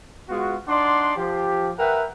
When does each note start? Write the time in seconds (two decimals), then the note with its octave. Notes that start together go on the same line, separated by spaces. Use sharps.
0.29 G#3 B3 F4 F#4
0.67 D4 D#4 D5 F#5 C6
1.17 F3 G4
1.78 A#4 B4 E5 F#5 G5